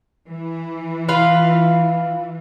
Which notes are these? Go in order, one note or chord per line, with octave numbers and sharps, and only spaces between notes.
E3
F4 B4 F5